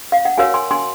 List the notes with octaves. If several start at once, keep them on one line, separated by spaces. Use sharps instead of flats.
F5
F#5
F#4 A#4 C#5 F5 G#5
G#5 C6
G#5 C6